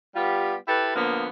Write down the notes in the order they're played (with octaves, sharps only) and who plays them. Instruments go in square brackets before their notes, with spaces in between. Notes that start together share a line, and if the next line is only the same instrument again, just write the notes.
[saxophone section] G3 B3 F4 G4
E4 G4 A4 B4
D3 F3 A#3 B3